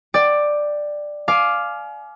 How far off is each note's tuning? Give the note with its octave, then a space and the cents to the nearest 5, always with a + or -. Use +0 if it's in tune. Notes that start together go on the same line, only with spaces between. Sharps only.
D5 +10 G5 +0
F5 +0 G#5 +35 D6 +5